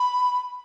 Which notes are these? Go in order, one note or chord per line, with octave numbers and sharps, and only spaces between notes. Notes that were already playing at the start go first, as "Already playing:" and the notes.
Already playing: B5